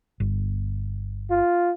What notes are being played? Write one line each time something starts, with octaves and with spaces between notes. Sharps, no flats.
G1
F4